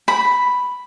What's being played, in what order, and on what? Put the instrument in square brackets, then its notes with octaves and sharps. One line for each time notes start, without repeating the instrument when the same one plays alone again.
[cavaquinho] B5